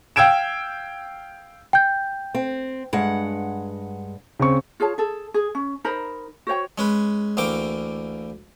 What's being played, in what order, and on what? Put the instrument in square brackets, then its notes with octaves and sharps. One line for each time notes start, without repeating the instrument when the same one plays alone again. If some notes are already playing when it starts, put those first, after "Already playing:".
[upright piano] F5 G5 E6 G#6 D7 E7
[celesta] G5 G6
[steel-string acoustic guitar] C4
G2 G#3 F#5
[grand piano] C#3 C4 C#6
[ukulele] F4 G#4 C#5 A5
G#4 A4
G#4
C#4
D#4 A#4 C5 B5
F#4 C5 C#5 G5
[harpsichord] G#3 C#4 B4
D2 E3 A#3 G5 D6